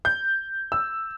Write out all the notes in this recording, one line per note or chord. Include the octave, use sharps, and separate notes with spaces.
G6
E6